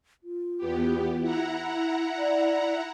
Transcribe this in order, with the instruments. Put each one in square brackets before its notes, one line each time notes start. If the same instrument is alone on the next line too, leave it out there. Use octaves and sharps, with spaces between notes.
[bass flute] F4
[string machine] E2 B3 G4
E4 F#5 A#5
[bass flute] D5